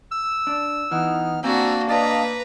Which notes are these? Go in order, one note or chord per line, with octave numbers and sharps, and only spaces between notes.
E6
D4
E3 B3 D#4 F6
A#3 C4 D4 F#4 G#5 A#5 E6
D4 B4 D5 D#5 F5 A#5